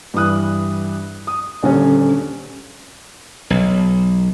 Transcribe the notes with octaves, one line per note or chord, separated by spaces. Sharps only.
G2 E3 D#6 F#6
D#6
D#1 D3 C#4 C#5
B1